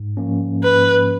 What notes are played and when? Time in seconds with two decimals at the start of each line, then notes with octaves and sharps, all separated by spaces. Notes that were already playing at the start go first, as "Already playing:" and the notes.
Already playing: G#2
0.17 F3 A#3 C#4
0.63 G#2 B4